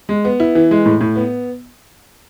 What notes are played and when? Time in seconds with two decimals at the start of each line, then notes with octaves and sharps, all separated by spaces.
0.09 G#3
0.25 B3
0.40 E4
0.55 E3
0.71 G#3
0.86 A2
1.01 A2
1.16 B3